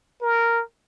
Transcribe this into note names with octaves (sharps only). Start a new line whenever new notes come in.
A#4